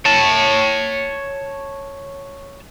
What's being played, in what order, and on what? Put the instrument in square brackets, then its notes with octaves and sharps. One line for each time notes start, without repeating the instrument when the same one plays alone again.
[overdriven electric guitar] C#5 A5